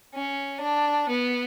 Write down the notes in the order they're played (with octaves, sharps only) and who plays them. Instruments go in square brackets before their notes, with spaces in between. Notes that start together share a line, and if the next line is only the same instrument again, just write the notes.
[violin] C#4
D4
B3